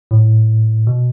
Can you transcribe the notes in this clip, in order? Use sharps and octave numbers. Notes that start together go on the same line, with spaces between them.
A2
B2